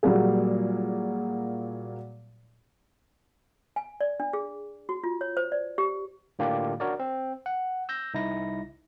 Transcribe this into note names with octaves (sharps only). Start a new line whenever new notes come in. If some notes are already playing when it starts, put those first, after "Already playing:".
A#2 F#3 G3 A#3 G#4
G#5
D5
D4
G#4
F#4
F4
C#5
C5
D5
G4
A2 D3 A#3 D4 F4 G4
D4 F#4 A#4 C#5 D5
C4
F#5
E6 G6 A#6
C2 D#4 E4 A#6